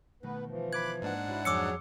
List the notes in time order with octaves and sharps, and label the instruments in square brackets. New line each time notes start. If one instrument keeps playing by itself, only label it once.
[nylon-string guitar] B2 D#3 A3 [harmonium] B3 B4
[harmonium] E3 F3
[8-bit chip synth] B5 D6 F#6 [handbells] G#6
[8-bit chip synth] G#2 D4 F#5 [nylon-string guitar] A#3
[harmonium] E4 [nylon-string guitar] F#4 G#4 C#5
[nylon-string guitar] F2 [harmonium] F#3 G#4 C#5 [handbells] D6 E6 C#7